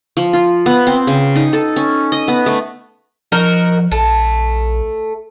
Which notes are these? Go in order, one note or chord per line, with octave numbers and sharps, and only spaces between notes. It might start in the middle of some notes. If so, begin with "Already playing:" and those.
F3
F4
B3
C4
C#3
D#4
A4
C#4
D#5
B3
A3
F3 D#4 F#4 A#4
A#1 A3